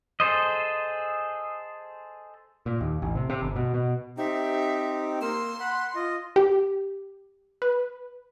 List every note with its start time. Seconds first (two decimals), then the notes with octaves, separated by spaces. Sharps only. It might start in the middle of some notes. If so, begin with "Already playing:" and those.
0.20 G#4 A4 C5 D#5
2.66 A#2
2.81 D#2
3.02 A1
3.15 C3
3.30 C3
3.42 G1
3.56 B2
3.74 B2
4.18 C4 D#4 G4 E5
5.21 A#3 C6 E6
5.60 F#5 B5
5.95 F4 D#5
6.36 G4
7.62 B4